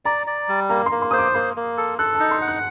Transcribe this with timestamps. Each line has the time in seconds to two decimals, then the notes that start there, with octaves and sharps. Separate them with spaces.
0.05 D5 A#5
0.27 D5
0.49 G3
0.69 A#3 A#5
0.86 C6
0.91 A#3
1.02 C6
1.11 C5 D#6
1.18 D6
1.34 A#3 C6
1.56 A#3
1.77 A4
1.99 A4 F#6
2.15 D#4 A5
2.31 C6
2.41 F#5
2.48 F#6